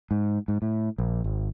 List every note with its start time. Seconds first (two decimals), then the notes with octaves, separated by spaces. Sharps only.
0.11 G#2
0.48 G#2
0.62 A2
0.98 A#1
1.24 G#1